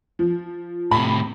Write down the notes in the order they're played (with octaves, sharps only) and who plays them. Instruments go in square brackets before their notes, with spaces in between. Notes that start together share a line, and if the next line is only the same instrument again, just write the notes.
[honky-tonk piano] F3
[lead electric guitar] A2 C3 [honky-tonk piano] B5